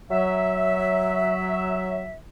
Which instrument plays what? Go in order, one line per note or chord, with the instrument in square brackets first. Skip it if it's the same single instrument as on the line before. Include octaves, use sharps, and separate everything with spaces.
[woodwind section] F#3 E5